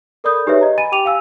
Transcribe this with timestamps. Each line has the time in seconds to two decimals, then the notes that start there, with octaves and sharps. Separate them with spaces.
0.24 A4 A#4 D5 B5 D#6 G6
0.47 D#4 G4 G#4 B4 C#5 E5
0.61 D#5 A#5
0.78 G#5 B5 A6 D#7
0.92 G4 G5 D6 D#7 F7
1.05 F5 G#5 E6